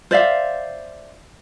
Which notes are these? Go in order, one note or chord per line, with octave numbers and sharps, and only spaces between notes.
C5 D5 E5 F5